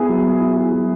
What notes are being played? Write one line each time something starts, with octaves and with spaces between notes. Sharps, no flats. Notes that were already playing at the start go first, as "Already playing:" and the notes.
Already playing: B3 E4 G#4
F#3
B3
E4
G#4
F#3